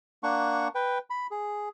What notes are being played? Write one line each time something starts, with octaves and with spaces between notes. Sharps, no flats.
A#3 D4 F#5 C#6
B4 G5
B5
G#4